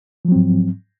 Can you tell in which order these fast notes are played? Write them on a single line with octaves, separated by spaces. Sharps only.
F3 F#3 C4 G#2